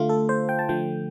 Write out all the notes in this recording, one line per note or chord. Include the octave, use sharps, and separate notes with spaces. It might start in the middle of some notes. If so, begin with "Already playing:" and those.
Already playing: D3 A3 F4
A4
C5
G5
A5
D3 F3 A3 G5